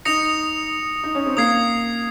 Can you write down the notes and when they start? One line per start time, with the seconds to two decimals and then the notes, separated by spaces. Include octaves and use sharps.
0.05 D#4 D#6 A#6 C#7 F7
1.03 D#4
1.15 C#4
1.26 C4
1.37 A#3 D#6 G#6 C7